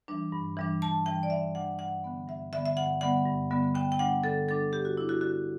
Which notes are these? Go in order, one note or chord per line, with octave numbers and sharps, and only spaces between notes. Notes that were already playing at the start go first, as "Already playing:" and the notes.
E3 G3 D4
G2
E3 G3 D4
G2 A5
E3 G3 D4 G5
D5
G2 E5
E3 G3 D4 F#5
G2 F#5
D3 G3 B3
G2 E5
D3 G3 B3 E5
E5
G2 F#5
D3 G3 B3 F#5
G2
D3 G3 B3
D3 G5
G5
G3 D4 F#5
D3 A4
G3 D4 A4
D3 G4
F#4
G3 D4 E4
F#4
D3 F#4